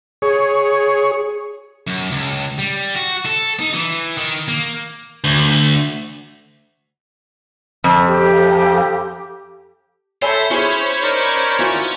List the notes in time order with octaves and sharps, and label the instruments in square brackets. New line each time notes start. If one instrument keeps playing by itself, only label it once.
[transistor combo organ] G#4 C#5
[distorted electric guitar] F#2
C#2
G3
F#4
A4
D#4
E3
D#3
A#3
[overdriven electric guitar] D2
[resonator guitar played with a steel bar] F2
[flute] G4
[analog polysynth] A4 E5 G6 [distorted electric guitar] C5 [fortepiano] C#5 G#5 B5
[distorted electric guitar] C#4 [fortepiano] E4 G#4 G#5 [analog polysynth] C5 C#5 B5
[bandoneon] D#4 A#4 D5
[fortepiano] E3 F4 F#4